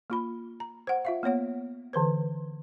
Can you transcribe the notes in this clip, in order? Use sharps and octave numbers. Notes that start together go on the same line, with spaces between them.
A#3 F4 B5
A#5
C5 F#5
F4 E5 F5
A#3 B3 C#5 F#5
D3 E3 B4 C5